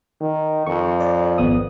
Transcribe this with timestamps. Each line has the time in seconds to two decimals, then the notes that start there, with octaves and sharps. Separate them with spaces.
0.21 D#3
0.66 F2 C#6
1.00 D5
1.38 G#1 B3 D#6